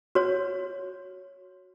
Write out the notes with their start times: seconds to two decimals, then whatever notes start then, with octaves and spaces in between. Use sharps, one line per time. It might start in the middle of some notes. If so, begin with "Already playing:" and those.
0.15 F#4 C#5